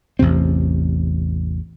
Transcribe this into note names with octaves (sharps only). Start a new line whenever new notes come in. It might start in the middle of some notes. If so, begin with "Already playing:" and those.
A1 E2 C3 C4